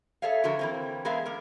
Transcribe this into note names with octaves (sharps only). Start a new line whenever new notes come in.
G#4 A4 C#5 E5 F5
D3 F3 F#3 F#4 A4 A#4
E3 A#3 C4
G#3 B3 G#4 A#4 E5 F5
A#3 A#4